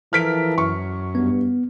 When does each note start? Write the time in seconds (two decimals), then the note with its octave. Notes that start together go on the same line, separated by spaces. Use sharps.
0.13 E3 F3 A4 A#4 F6 B6 D7
0.58 F#2 C#6
1.15 G2 B3